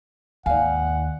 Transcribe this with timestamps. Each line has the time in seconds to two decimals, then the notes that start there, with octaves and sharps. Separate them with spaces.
0.46 D#2 G#2 D5 F5 F#5 G#5